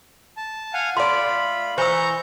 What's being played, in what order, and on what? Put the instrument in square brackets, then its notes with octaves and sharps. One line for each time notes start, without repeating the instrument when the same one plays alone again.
[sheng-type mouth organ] A5
F5 F#5 G#5
[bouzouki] A3 D5 [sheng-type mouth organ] F4 B5 [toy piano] C6
[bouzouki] E3 [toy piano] C5 E6 [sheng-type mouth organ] A#5 C#6 G6